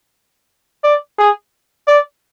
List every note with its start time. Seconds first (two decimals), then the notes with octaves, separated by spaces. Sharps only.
0.84 D5
1.19 G#4
1.87 D5